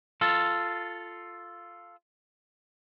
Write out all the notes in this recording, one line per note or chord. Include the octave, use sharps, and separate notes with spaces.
F4 A4